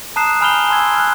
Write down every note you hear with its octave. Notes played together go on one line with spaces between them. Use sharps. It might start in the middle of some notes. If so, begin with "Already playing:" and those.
A5 A#5 D#6 F#6 C7 E7
G#5 B5 F6 G6 F7 G7
G#5 A5 C6 E6 G#6
F6 F#6